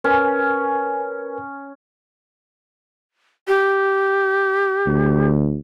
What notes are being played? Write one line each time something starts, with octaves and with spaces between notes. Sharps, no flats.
C#4 A#4 B4 G#5
G4
D2